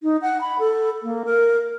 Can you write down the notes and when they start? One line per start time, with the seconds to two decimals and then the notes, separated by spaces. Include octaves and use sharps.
0.03 D#4
0.22 F#5
0.41 B5
0.59 A4
1.03 A#3
1.25 A#4